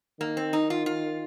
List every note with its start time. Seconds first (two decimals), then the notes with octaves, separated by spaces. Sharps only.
0.21 D#3 A#3
0.37 C4
0.53 D#4
0.70 F4
0.86 F4